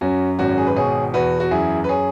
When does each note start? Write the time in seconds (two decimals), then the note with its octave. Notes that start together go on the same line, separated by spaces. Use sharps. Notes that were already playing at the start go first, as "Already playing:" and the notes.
0.01 F#2 C#4 F#4
0.38 G#1 C#4 F#4
0.58 G#4
0.67 B4
0.76 B2 G#4 C#5
1.14 E2 F#4 B4
1.40 F#4
1.51 F#2 E4 G#4
1.84 B4
1.89 G#4 C#5